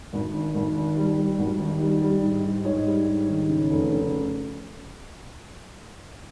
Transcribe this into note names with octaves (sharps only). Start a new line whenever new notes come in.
G#1
D#3
G#1
D#3
G3
G3
G#1
D#3
G3
G3
G#2
G#2
G#2 C#5
G3
G#2
D#3
C#3
F1
C#3